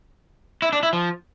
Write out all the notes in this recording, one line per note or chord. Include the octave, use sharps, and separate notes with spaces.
E4
D4
E4
F3